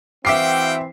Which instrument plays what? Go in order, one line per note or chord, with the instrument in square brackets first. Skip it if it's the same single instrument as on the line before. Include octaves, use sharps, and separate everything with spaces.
[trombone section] E3 C4 [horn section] F#4 F5 G5 [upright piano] E5 D6 C7